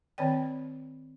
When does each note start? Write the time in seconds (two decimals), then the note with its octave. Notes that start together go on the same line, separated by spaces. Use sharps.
0.18 D#3 C4 C#5 D5 G5